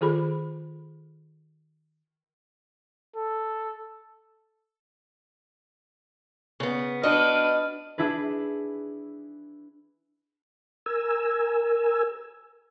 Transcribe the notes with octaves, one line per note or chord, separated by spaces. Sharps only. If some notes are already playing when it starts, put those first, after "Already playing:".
D#3 F4 G#4 A4 B5
A4
C#3 B3
D4 F#4 B4 D#5 F6
D4 E4 G#4 B4
A#4 G#5 E6